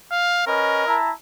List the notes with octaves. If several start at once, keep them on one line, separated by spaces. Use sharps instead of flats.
F5
C#4 A#4 B4 D#5
E4 A5 A#5